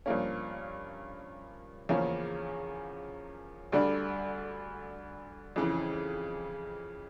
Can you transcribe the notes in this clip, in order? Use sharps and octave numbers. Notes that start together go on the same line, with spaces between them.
G2 F3 A#3 C#4
E2 C#3 F3 A#3 C#4
D2 D3 G3 D4
F2 C#3 E3